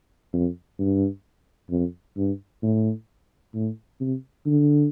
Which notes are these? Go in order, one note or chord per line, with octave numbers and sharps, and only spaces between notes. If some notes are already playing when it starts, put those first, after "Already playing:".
F2
G2
F2
G2
A2
A2
C3
D3